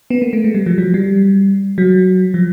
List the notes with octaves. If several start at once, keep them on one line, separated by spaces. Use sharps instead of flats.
B3
A#3
A3
G#3
G3
F3
F#3
G3
F#3
F3